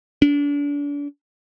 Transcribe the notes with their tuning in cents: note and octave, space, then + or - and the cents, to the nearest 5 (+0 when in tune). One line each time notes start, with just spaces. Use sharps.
D4 -35